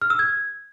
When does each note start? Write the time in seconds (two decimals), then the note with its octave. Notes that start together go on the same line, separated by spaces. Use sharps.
0.02 F6
0.10 E6
0.19 G#6